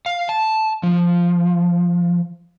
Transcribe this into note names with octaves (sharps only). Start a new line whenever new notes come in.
F5
A5
F3